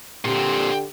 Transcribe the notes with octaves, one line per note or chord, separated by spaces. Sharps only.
A#2 D3 C4 G4